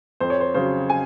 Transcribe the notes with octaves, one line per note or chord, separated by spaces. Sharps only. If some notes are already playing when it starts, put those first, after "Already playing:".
F2 C5
C#5
C5
C#3 F#3 C5
G#5